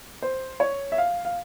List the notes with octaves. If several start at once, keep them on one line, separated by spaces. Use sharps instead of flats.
C5
C#5
E5
F5
F5